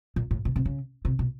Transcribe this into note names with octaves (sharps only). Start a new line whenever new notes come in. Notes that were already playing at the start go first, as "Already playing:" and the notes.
A#2
A2
B2
C3
C#3
C3
B2